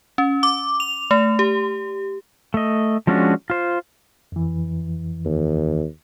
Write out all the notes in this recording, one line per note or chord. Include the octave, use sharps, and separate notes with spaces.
C#4
D6
F7
A3
G4
A3 D#5
F3 G#3 C#4 D4 F#4
F4 C5
F2 E3
D#2